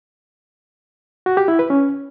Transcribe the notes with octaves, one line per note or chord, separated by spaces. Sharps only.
F#4
G4
E4
B4
C#4